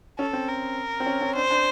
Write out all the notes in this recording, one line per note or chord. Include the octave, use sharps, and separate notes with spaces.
C#4 A4
C4
A#4
C4
C#4
C#4
D4 C5
D4